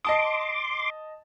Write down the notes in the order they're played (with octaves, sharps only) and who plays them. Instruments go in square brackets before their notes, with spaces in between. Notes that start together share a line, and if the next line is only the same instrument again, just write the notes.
[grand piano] D#5 A5 D#6 [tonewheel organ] C6 D6